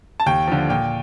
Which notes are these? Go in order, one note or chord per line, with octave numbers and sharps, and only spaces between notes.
A5
D#2 G5
D3 F3
A#2 G5